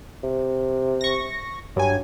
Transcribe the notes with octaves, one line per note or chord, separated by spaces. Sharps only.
C3
C#6 A#6
G2 F#3 G#5